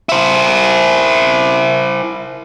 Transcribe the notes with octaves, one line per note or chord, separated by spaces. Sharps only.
E4 C5